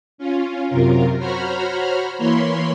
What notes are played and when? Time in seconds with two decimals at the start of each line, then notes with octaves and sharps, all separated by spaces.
0.18 C#4 F4
0.68 F#2 C3 F4 A#4
1.19 F#4 C5 C#5 A#5 B5 F6
2.18 E3 A#3 C#5 B5 C6